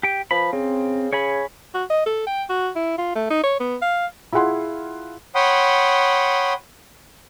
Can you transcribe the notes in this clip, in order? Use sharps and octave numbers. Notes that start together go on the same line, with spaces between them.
G4 G5
F3 B4 B5
C#3 C4
C#3 C#5 G#5 B5
F#4
D#5
A4
G5
F#4
E4
F4
A3
D#4
C#5
B3
F5
E4 F4 G#4 F#5 C6
C#5 F#5 G5 B5 C6 D#6